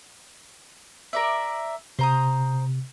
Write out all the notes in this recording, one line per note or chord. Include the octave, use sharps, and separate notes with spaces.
A#4 D5 E5
C3 C5 A#5 D#6